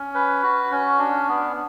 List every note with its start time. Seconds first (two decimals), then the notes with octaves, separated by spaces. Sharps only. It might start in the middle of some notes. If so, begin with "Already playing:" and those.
Already playing: C#4
0.14 B4
0.43 F#4
0.71 C#4
0.99 D4
1.28 B3